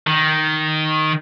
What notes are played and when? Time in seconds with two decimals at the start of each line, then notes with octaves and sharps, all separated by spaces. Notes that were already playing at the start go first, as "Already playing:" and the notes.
0.07 D#3